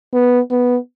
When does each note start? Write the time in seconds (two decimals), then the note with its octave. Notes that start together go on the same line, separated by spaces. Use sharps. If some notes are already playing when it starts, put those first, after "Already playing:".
0.14 B3
0.51 B3